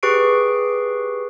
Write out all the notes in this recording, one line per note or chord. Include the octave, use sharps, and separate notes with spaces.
G4 G#4 B4 C#6 C7 D7